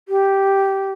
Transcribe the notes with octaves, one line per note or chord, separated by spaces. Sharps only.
G4